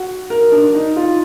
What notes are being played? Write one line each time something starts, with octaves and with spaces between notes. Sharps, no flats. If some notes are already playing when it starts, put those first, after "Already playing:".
Already playing: F#4
A#4
D4
D#4
F4